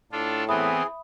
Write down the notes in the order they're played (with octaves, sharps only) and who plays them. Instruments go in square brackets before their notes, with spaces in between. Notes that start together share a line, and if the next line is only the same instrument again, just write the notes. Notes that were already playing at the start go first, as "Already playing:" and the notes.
[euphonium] A2 [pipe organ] D4 F4 A4
[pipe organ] E3 B3 C4 [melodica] G#4 [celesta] E5 B5 D#6